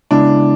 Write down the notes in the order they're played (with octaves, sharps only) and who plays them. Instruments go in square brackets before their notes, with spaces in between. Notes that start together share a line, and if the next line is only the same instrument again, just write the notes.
[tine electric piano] C#3 G#3 B3 E4 [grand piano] D4